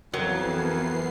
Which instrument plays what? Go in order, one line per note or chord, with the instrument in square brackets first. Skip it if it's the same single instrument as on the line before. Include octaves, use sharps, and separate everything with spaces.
[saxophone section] F2 [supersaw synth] E3 B3 C7 [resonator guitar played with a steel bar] F#3 [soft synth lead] A#4